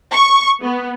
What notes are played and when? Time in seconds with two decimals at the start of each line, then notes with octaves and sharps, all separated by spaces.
0.11 C#6
0.63 B3